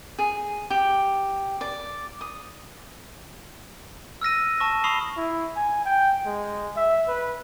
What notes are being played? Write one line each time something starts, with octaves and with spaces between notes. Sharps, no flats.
G#4
G4
D5
D#6
E6 F6 A#6 D#7
A5 C#6 A#6
B5 C#6 D#6 C7 F7 G7
E4
G#5
G5
G#3
E5
B4